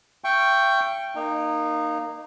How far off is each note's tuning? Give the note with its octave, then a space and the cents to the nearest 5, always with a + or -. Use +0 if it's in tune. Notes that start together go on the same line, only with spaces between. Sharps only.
E5 +40 G5 +0 C#6 +0
A#3 +0 D#4 -20